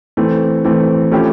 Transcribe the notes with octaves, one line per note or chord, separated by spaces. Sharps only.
E3 A3 C4
E3 A3 C4
F3 A3 C#4 E4 G4